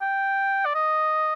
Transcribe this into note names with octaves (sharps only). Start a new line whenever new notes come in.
G5
D5
D#5